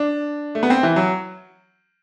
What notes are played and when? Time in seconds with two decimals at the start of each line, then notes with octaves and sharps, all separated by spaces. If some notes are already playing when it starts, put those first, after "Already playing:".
Already playing: D4
0.55 A3
0.63 B3
0.70 C4
0.83 E3
0.96 F#3